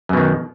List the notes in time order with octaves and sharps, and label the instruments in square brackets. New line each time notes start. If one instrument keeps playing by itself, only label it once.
[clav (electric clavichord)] F#2
B2
D#3